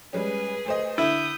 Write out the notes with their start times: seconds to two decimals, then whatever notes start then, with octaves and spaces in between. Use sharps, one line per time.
0.13 G3 G#3 C#4 G#4 B4
0.66 A3 C5 D#5
0.98 D3 E4 D#6 G6